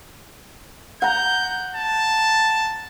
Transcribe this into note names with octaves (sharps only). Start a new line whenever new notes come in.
F#5 A#5 G6
A5